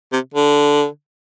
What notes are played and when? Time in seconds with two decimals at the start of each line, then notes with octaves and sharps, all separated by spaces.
0.13 C3
0.34 D3